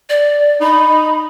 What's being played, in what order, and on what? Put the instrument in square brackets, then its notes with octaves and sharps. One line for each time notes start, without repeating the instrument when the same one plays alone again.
[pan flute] D5
[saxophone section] D#4 [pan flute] B5